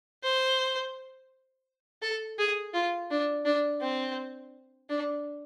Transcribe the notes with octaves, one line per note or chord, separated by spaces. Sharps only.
C5
A4
G#4
F4
D4
D4
C4
D4